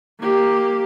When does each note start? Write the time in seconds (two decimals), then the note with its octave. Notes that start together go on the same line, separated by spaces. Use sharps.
0.20 A#3 G4